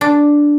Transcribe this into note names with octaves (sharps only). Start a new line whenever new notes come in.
D4